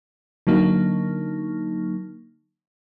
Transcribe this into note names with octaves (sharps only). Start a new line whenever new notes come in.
D3 F#3 A#3 D#4